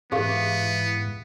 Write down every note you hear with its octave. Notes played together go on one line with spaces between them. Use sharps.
G#2 E3 B3 G4 G#4 F5